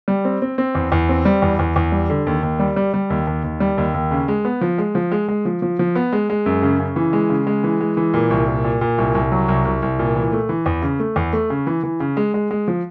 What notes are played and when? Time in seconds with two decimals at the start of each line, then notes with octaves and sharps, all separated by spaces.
0.08 G3
0.25 C4
0.42 C4
0.58 C4
0.75 E2
0.92 E2
1.09 C4
1.25 G3
1.42 E2
1.59 E2
1.76 E2
1.92 G3
2.10 D3
2.27 D#2
2.43 D#2
2.60 G3
2.76 G3
2.94 G3
3.10 D#2
3.27 D#2
3.44 D#2
3.60 G3
3.78 D#2
3.94 D#2
4.11 C#3
4.28 G#3
4.45 B3
4.61 F3
4.78 G#3
4.95 F3
5.11 G#3
5.28 G#3
5.45 F3
5.62 F3
5.79 F3
5.95 B3
6.13 G#3
6.30 G#3
6.46 F#2
6.62 C#3
6.79 C#3
6.96 E3
7.13 G#3
7.30 C#3
7.47 G#3
7.64 E3
7.80 G#3
7.97 E3
8.14 A#2
8.30 C2
8.48 A#2
8.64 A#2
8.81 A#2
8.98 C2
9.15 C2
9.32 F#3
9.48 C2
9.65 C2
9.82 C2
9.99 A#2
10.15 E3
10.32 A3
10.49 E3
10.66 E2
10.82 C#3
10.99 A3
11.16 E2
11.33 A3
11.50 C#3
11.67 E3
11.83 E3
12.00 C#3
12.17 G#3
12.34 G#3
12.51 G#3
12.68 F3